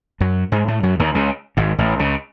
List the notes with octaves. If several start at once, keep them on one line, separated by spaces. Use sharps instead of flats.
F#2 F#3
G#2 G#3
A2 A3
F#2 F#3
D#2 D#3
C#2 C#3
G#1 G#2
A1 A2
C#2 C#3